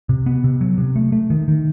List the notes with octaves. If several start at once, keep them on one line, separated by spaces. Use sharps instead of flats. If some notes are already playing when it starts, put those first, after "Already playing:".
C3
B3
C3
F#3
C3
A3
A3
D#3
D#3